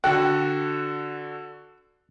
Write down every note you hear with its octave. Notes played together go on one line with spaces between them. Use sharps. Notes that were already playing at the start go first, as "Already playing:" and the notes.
D3 F#4 A4 G5 F#6